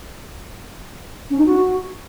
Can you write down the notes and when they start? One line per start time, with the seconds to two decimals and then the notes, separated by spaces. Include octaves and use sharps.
1.30 C#4
1.38 D#4
1.46 F#4